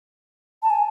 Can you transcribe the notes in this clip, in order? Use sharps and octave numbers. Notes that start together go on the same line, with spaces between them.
A5
G#5